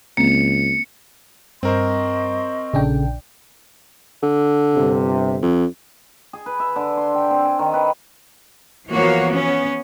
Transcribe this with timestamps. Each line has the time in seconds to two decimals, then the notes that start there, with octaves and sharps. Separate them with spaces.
0.17 C#2 A#3 C4 C#7
1.63 G2 C4 A#4 C5 D#5 C6 C#6
2.74 A#1 C#3 C#4 D4 A4 G5
4.23 D3
4.76 G1 C3
5.42 F2
6.33 G#4
6.46 B4
6.60 E5
6.76 D3
6.97 C6
7.14 G5
7.31 C4
7.45 G#5
7.59 D#3
7.74 B4
8.89 E3 F3 A#3 B3 F#4 C#5
9.29 B3 C#4